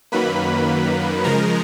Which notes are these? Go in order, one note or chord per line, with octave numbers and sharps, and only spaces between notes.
F#2 D#3 F#3 A#3 B4 B5
C#3 F3 G#3 A#4 A#5